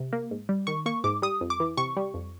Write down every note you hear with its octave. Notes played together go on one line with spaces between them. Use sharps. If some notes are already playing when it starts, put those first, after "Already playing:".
Already playing: C3
A#3
G#2
G3
D#3 C#6
A#3 C#6
G#2 D6
G3 D#6
F2
D6
E3
C3 C#6
G3
F2